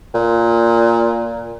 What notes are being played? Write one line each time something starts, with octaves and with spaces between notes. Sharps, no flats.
A#2